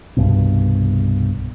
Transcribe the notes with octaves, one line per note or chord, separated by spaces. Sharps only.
C2 G2 B2